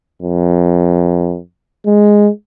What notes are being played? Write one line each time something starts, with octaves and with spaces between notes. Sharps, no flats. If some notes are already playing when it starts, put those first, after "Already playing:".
F2
G#3